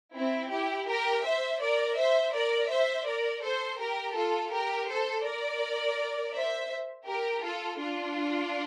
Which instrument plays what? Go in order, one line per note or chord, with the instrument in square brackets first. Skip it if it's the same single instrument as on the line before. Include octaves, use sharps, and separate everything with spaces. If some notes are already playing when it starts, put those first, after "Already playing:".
[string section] C4 E4
E4 G4
G4 A#4
C5 E5
A#4 D5
C5 E5
A#4 D5
C5 E5
A#4 D5
A4 C5
G4 A#4
F4 A4
G4 A#4
A4 C5
A#4 D5
C5 E5
G4 A#4
F4 A4
D4 F4